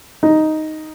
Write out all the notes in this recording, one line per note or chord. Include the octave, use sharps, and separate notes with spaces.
D#4